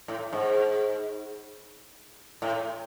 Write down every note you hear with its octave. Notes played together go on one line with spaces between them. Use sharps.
A2
G#2
A2